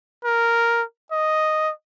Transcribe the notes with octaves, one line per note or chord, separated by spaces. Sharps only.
A#4
D#5